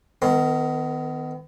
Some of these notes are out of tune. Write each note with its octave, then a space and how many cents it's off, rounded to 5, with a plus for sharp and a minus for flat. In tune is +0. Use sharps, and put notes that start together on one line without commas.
D#3 +0 B3 +30 A#4 -25